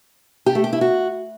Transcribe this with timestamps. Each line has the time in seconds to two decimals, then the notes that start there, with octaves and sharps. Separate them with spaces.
0.46 G4
0.55 A3
0.64 G4
0.73 E4
0.81 F#4